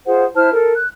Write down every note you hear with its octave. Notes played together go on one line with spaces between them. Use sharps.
F4 G#4 C5 F#5
E4 C5 A5 F6
A4 A#4
F#6